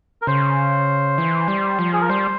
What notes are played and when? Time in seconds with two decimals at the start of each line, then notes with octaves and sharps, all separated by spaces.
0.22 A#4
0.27 C#3 C5
1.18 E3
1.48 G3
1.79 F3
1.93 G#4
2.01 A#4
2.09 G3 C5